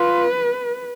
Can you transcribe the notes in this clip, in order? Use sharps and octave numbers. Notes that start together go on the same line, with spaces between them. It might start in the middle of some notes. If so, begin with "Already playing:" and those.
Already playing: F4 B4